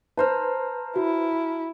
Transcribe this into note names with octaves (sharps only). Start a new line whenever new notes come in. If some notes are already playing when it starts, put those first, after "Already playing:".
B4 C5 A5 A#5 F6
E4 F#4